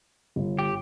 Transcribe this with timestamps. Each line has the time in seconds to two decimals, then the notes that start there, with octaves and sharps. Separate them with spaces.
0.36 G1
0.59 G4